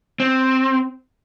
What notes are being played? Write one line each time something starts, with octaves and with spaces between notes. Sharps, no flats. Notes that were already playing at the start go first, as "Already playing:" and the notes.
C4